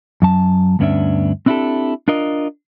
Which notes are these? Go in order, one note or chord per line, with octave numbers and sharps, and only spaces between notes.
F#2 F#3 A5
D2 G2 B3 C#4 D4 E5
C4 D4 E4 F#4 G4 A4
D4 F4 A#4 D#5